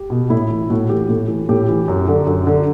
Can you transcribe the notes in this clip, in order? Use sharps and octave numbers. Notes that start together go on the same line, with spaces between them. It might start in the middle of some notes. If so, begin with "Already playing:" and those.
Already playing: G4
B2
A2 E4
E3
A2 F#4
E3 G4
A2 A4
E3
A2 G4
E3
F#2
D3
F#2
D3